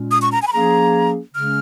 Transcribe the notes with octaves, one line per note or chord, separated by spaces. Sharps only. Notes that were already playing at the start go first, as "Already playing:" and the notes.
Already playing: A#2 G#3 C#4
D#6
C#6
A#5
G#5
B5
F3 A#3 C#4 G#4 A#5
C#3 G#3 C#4 F6